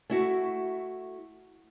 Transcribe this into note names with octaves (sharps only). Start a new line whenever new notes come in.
A3 E4 F#4